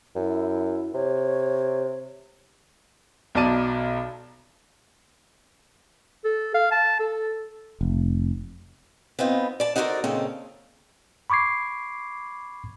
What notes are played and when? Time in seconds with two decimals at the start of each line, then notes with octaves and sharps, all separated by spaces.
0.16 F#2 E4
0.94 C3 C#5
3.35 B1 B2 D5 A5 D#7
6.24 A4
6.54 F5
6.71 A5
7.00 A4
7.81 F1
9.19 B3 C4 D#4 F4
9.60 D5 A5
9.76 D#4 F#4 A4 A#4 C5 D5
10.04 A#2 C#3 C4 D#4 A4
11.30 B5 C#6 D6 G#6 C7